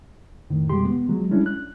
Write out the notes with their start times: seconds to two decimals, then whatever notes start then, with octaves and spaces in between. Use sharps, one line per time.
0.50 F2 A2 D#3
0.69 F2 B2 G3 G#3 G4 C6
0.85 B3
1.08 F3 F#3 G#3
1.30 G3 G#3 C#4 D4 E4
1.46 F#6